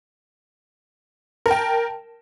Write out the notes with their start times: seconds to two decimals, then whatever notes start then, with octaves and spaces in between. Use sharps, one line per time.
1.46 A#4
1.48 A5
1.51 G5